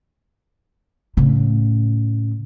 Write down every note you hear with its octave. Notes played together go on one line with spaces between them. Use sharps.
A2 C#3